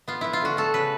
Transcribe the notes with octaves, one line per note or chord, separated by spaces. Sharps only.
B3 F4
B3 E4
F4
D3 F#4
A3 A4
C#3 B4